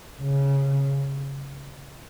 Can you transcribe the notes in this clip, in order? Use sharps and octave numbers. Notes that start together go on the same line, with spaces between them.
C#3